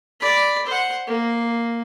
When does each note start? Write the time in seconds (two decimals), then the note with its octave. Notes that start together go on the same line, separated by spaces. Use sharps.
0.20 D5 B5
0.66 C5 F#5
1.07 A#3